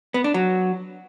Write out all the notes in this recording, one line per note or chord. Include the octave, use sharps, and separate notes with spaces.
B3
D4
F#3